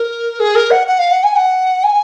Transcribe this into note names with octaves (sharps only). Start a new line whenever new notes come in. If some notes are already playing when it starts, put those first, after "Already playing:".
Already playing: A#4
G#4
A#4
F#5
F#5
F5
F#5
G#5
F#5
G#5